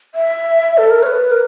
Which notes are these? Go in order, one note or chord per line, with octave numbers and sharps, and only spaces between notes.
E5
A4
A#4
C#5
B4
A#4